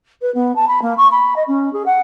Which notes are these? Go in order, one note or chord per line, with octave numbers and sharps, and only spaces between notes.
B4
B3
A5
B5
A#3
C#6
B5
D#5
C#4
G#4
F#5